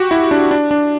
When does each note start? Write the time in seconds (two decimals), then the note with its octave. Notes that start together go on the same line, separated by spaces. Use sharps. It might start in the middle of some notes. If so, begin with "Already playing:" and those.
Already playing: F#4 G4
0.11 E4
0.31 D4
0.51 D4
0.71 D4